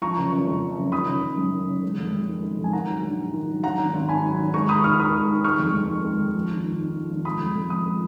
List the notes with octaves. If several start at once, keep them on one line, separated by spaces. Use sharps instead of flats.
F3 A#5 C#6
F#1
F#1
F2
F3
F#1
D#3 B5 D#6
F#1
F#1
F#2
D#3
F#1
G#3
F2
F2
D#3
G#3
F2
G#5
D#3 F#5 A#5
F#3
A#1
G#2
D#3
F#3
F#3 F#5 A#5
G#1
G#1
G#2 G#5 B5
F#3
G#1
G#3 A#5 C#6
D#2 B5 D#6
D#2 C#6 F6
D#3 B5 D#6
G#3
D#2
G#3 C#6 F6
F2
F2
D#3
G#3
F2
F3
G#1
G#1
G#2
F3
G#1
G#3 B5 D#6
F2
F2
F3 B5 D#6
G#3